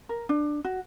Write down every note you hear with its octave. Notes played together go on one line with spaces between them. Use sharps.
A#4
D4
F#4